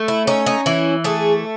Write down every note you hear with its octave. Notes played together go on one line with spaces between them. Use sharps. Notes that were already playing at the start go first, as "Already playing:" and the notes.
Already playing: A3
E4
C#4 D#4
D#4
E3 E4
A3 G#4